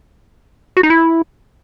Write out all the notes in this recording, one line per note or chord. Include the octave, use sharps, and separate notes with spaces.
F#4
D#4
E4